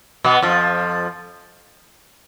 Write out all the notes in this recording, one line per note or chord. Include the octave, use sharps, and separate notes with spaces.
B2 B3
F2 F3